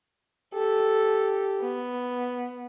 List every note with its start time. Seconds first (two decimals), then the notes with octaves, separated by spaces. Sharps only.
0.54 G4 A4
1.61 B3